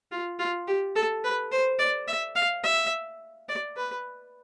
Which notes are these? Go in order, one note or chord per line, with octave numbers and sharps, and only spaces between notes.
F4
F4
G4
A4
B4
C5
D5
E5
F5
E5
D5
B4